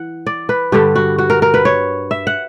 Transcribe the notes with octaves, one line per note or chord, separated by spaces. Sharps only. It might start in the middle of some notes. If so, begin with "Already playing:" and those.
Already playing: E3 F#5
D5
B4
G2 D3 G3 G4
F#4
F#4
A#4
A#4
B4
C#5
E5
F#5